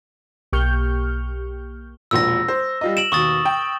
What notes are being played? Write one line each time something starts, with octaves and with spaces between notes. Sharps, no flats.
B1 A#3 G4 C#6 F6 G6
E1 A#1 A#2 E6 A#6
C5
G3 F4 D#5
D7 E7 F#7
D#2 B2 C#6 D#6 A6
G5